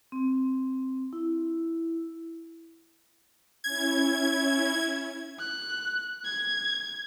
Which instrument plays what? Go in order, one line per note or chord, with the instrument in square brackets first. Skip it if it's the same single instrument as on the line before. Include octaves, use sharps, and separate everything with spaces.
[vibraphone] C4
E4
[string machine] C#4 E4 [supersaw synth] G#6
[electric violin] F#6
G#6